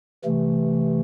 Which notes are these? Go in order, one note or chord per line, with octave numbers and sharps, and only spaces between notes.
C3 E3 A3